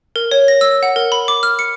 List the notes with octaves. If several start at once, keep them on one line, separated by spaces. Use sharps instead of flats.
A#4
C#5
A#6
E6
F#5
A#4
B5
D6
F6
C#7